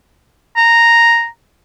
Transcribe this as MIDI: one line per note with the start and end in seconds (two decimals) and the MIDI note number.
0.57 1.26 82